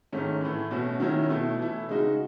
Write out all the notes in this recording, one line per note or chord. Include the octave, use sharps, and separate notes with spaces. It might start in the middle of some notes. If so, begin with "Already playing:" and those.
G#2 D#3 A3 C#4
A2 E3 A3
B2 A3 C#4 F#4
D#3 F#3 C#4 E4
B2 A3 E4
E3 A3 E4
C#3 G#3 D#4 F#4